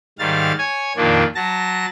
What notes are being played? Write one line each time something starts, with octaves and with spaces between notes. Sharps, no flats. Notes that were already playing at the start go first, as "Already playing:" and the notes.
G#2 D#3 G3 F5 A6
C#5 G#5
F2 A#2 D#3 F3 A#3 D4
F#3 A5 A#6